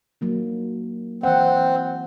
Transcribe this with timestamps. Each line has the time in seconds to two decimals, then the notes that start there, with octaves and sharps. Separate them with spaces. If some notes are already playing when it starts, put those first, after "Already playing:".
0.21 F#3 A#3 D#4
1.23 E3 C4 F#5